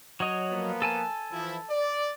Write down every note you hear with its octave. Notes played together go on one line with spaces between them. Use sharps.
F#3 C#5 D#5
F3 A#3 B3
A4 G#5 A5
E3 F3 E4
D5